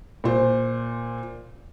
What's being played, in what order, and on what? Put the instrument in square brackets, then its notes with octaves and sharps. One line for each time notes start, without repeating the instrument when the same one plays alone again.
[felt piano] A#2 C5